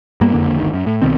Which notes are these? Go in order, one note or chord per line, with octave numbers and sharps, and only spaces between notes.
G2 G3 A#3 B3
F#1 F2 D3 A#3
G1 D2 D#3
F#2
A2
C2 B2 D#3 C4